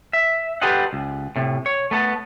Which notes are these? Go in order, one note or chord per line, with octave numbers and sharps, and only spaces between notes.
E5
G4 A4 B4 C5 D#5 F#5
C#2
A2 C3
C#5
A3 B3 A4